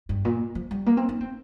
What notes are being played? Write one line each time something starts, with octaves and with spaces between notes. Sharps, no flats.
G2
A#2
F3
G3
A#3
C4
D#4
C4